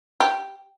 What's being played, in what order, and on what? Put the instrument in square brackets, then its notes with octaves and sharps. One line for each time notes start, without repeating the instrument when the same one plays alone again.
[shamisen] G4